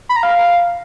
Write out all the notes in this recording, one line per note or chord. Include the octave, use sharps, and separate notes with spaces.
B5
A#5
F5